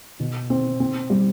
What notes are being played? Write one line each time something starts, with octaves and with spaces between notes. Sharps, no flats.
B2
C4
C4
G3